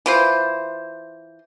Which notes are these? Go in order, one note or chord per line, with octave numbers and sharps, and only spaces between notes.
E3 F4 C5